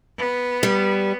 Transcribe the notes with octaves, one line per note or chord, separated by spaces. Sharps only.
B3
G3